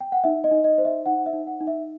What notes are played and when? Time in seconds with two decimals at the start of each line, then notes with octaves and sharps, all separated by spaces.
0.01 G5
0.12 F#5
0.24 D#4 E5
0.44 D#5
0.51 D#4
0.64 D#5
0.78 C5
0.85 E5
1.06 D#4 F#5
1.26 E5
1.33 D#4
1.47 F#5
1.61 D#4
1.67 E5